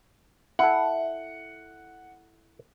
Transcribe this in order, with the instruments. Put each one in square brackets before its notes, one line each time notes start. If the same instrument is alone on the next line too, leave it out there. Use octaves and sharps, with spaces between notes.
[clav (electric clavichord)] E4 A4 [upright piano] F#5